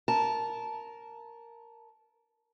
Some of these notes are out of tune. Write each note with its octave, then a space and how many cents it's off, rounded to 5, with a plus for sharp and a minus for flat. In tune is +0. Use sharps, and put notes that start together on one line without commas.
A#4 +0 A5 -15